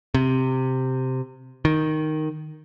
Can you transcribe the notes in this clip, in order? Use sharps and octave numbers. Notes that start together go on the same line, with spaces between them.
C3
D#3